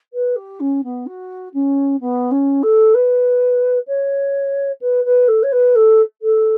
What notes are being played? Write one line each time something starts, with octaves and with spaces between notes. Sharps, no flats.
B4
G4
C#4
B3
F#4
C#4
B3
C#4
A4
B4
C#5
B4
B4
A4
C#5
B4
A4
A4